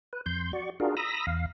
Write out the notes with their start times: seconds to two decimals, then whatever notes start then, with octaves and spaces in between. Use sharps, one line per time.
0.13 B4
0.26 F2 C6 G6
0.53 F#4 D5 C#6
0.80 D4 F4 F#4 G#4 A#4
0.97 A#5 B5 D#6 E6 A#6
1.27 E2 F5